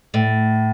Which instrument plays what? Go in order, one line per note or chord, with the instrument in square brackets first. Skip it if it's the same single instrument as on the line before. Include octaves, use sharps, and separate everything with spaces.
[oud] A2